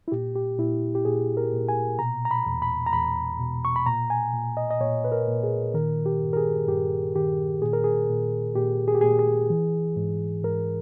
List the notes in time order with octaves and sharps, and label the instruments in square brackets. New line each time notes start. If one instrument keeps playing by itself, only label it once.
[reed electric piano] E4
A#2 G4
G4
A#2 E4
G4
A#2 G#4
A#4
A#2
G#5
B2 A#5
A#5
B5
E2
B5
A#5
E2 B5
B2
C#6
B5
A#2 A#5
G#5
A#2
D#5
D#5
A#2 C#5
B4
A#4
A#2
G#4
D#3 A#4
G4
G2
A#4
G#4
G2 G4
D#3 G4
A#2 G#4
A#4
G#4
A#2
A#2 G4
G#4
G4
A#2 G#4
G#4
E3
G#2
G#2 A#4